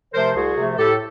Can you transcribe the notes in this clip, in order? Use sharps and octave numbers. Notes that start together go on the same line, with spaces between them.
C3 F3 A3 A#4 C5
C2 F#4 G#4
C3 F3 A3
A2 G4 A4